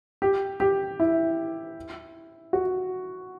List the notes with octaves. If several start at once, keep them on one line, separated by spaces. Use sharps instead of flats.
G4
G4
E4
F#4